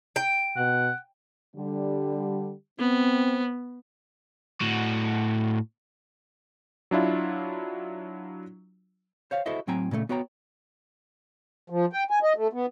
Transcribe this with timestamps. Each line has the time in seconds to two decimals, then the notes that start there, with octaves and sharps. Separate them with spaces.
0.16 G5
0.57 B2 F#5
1.56 D3 G3
2.79 B3 C4
4.61 A2 F#4
6.91 F#3 D4 E4 F4
9.31 C5 C#5 F5
9.46 E4 F#4 A4 C5 D#5 E5
9.67 A2 F#3 C4 G5 G#5 A#5
9.91 A#2 C#3 F#3 A3
10.09 B3 F#4 C#5 G5 A#5
11.70 F3
11.93 G5
12.10 G#5
12.23 D#5
12.36 A3
12.53 B3